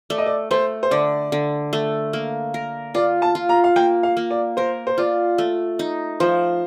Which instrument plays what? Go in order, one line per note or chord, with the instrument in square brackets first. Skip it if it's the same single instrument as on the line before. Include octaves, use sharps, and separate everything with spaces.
[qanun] A3 [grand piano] D5
[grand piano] D#5
D5
[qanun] A3 [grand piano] C5
[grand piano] C5
[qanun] D3 [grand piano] D5
[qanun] D3
A3
A#3
A#4
[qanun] F4 [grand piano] D5
[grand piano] A5
[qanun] F4
[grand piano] A#5
F5
[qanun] A#3 [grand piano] G5
[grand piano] F5
[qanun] A#3
[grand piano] D5
[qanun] A#4 [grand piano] C5
[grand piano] C5
[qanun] F4 [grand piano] D5
[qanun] A3
D#4
[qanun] F3 [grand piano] C5